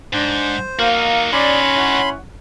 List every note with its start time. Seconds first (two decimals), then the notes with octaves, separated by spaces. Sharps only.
0.13 G#2 D4 C5
0.79 A#3 D#4 F#4 F5
1.33 C#4 D5 B5 C6
1.75 E4 C#5 F#5